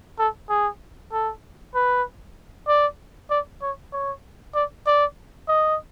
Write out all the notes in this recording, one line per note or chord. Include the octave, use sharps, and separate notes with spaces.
A4
G#4
A4
B4
D5
D5
C#5
C#5
D5
D5
D#5